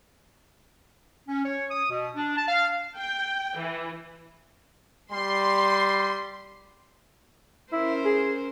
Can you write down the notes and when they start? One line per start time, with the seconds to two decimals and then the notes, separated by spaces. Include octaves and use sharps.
1.28 C#4
1.45 C#5
1.71 D#6
1.90 B2
2.16 D4
2.36 A5
2.48 F5
2.98 G5
3.57 E3
5.12 G3 C6
7.72 C#4 E4 A#4 C5
8.05 G#4